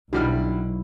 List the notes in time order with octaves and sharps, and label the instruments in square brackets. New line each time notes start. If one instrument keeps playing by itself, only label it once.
[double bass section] B1 [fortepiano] D3 G3 F6 [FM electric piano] D#4 F#4 [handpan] E4